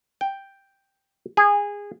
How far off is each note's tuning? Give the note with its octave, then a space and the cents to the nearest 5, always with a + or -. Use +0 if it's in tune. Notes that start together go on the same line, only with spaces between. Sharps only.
G5 +5
G#4 -20